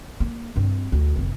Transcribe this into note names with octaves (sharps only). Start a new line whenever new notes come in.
A#3
G2 C4
D2
F1 D#2